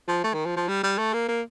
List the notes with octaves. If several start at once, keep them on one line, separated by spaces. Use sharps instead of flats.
F3
A3
D#3
F3
F3
G3
G3
A3
A#3
A#3